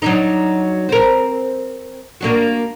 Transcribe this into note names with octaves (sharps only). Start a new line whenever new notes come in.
F#3 D4 D#4
C4 A#4
A#3 D4 F#4